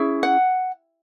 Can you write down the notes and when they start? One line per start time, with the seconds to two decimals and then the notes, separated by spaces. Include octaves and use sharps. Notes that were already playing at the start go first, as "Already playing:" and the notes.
Already playing: C#4 E4 G#4
0.23 F#5